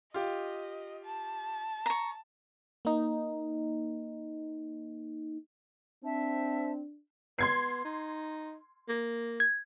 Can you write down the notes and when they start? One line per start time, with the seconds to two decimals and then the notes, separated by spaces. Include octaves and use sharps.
0.14 F4 G4 D#5
1.05 A5
1.86 A#5 C#6
2.85 A#3 D#4
6.04 C4 D4 E5 A5
7.39 B3 C6 G#6 C7
7.85 D#4
8.88 A#3
9.40 G#6